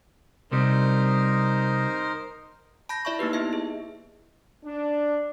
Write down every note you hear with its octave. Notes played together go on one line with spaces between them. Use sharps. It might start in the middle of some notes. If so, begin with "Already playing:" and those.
C2 C3 G3 D#4 A#4 C5
A5 B5 G6 A#6
E4 D5 E5 A5 C#6
A#3 D#4 G4 B4
B3 E4 D#5 E5
G#4
D4